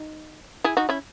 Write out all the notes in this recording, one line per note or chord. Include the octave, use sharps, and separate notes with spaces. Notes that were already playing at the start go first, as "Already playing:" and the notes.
Already playing: D#4
E4 G#4
D#4 F#4
C#4 E4